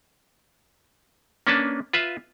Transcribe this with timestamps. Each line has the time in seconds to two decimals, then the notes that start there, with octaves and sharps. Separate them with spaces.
1.47 A#3 C#4 D4 B4 A5
1.93 F4 B4 E5 F5